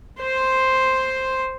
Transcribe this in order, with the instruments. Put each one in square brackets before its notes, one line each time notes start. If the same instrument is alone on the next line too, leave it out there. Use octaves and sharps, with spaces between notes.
[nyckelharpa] C5 C6